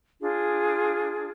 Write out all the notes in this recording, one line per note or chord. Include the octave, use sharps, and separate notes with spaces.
D4 F4 G#4